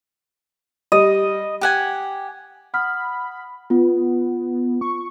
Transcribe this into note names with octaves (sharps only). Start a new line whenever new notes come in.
G3 D#5
G4 F#5 G#5
F#5 B5 D#6 F6
B3 F4
C#6